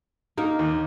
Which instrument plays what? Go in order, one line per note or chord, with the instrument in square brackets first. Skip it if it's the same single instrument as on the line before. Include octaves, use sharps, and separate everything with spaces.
[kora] A#3 D#4 A#4
[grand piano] D#2